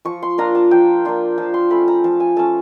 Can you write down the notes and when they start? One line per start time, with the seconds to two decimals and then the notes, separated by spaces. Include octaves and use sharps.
0.05 F3 C#6
0.23 C6
0.38 A#3 D4 F4 A#5
0.55 A5
0.71 F3 G5
1.05 A#3 D4 F4
1.38 F3 A5
1.54 C6
1.70 A3 C#4 B5
1.88 A#5
2.04 F3 A5
2.20 G#5
2.36 A3 C#4 A5